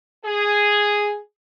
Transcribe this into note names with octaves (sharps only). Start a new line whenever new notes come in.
G#4